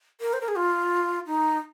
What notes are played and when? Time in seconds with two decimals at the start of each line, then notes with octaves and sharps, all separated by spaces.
0.21 A#4
0.33 C5
0.41 A#4
0.48 G#4
0.56 F4
1.27 D#4